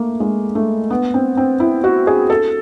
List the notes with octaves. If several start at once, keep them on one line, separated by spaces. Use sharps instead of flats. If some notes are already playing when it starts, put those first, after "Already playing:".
Already playing: A3 A#3
G#3
A3
B3
C4
C4
E4
F#4
G#4
A4